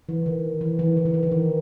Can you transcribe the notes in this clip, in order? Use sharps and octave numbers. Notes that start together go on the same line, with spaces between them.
E3
D#3
E3
E3
E3
D#3
E3
D#3
E3